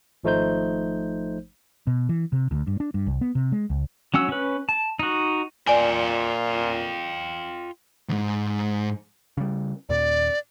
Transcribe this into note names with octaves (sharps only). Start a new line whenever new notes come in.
G#1 F3 A3 D#4 C5 G6
B2
E3
C3
D2
G2
D4
G2
C2
B3
C3
G#3
C#2
F#3 C#4 F#5 E6
C#4 B4
A5
D#4 F#4
A#2 F4 D5 G5 G#5
D2 G#2
C#3 G3
D#2 A#2 D5